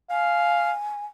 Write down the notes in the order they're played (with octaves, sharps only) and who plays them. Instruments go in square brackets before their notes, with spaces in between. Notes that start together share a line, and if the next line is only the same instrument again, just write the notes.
[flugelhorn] F5 [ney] G#5